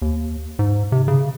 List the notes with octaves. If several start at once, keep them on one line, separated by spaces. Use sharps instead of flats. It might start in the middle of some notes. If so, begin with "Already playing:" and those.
D#2
G#2
C3
C#3